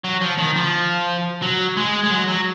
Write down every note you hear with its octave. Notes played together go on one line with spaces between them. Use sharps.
F#3
F3
D#3
F3
F#3
G#3
G#3
F#3
F#3